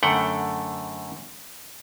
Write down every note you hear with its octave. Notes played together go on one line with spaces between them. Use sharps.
F#2 D3 A3 F#5 G5